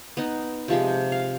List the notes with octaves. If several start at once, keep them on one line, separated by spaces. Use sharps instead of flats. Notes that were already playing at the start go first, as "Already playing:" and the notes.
B3 D#4
C3 F3 G#3 G4
F5